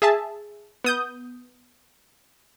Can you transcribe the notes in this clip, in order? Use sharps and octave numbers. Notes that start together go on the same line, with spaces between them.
G#4 E5 A5
B3 D#6 G6